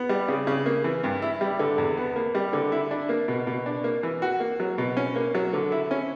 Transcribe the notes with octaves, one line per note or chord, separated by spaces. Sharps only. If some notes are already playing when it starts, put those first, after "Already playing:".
Already playing: B3
G3
C#3
C#3
A#3
E3
G2
E4
G3
D3
E2
B3
A#3
G3
D3
E4
D4
A#3
B2
B2
D4
A#3
E3
F#4
A#3
F#3
B2
C#4
A#3
F#3
D3
E4
C#4